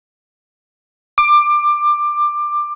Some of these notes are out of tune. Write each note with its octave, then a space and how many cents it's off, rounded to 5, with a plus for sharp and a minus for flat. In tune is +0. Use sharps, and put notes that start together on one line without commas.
D6 +20